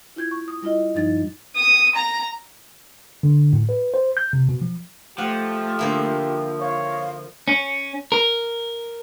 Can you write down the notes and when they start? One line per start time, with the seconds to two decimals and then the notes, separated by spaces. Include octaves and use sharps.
0.16 E4 F4 G6 G#6
0.31 C#6
0.48 D#6
0.62 G3 E4 F4 D#5
0.95 G2 F3 G3 D#4 A6
1.56 D#6
1.95 A#5
3.23 D3
3.53 A2
3.69 B4
3.94 C5
4.17 G6
4.33 C3
4.49 B2
4.61 F3
5.18 F3 A3 G4 F#5
5.79 D3 A#3 E4
6.60 C#5 F5
7.48 C#4
8.12 A#4